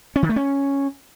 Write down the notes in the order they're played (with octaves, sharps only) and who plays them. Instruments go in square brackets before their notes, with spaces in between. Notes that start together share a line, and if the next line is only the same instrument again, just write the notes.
[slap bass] C#4
D#3
A3
C#4